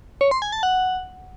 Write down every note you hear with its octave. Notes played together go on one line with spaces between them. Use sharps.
C#5
C6
G#5
A5
F#5